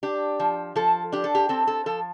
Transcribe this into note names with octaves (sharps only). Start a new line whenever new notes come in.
D4 G4
F3
F3 A4
D4 G4
A4
G4
C4 A4
A4
F3 A4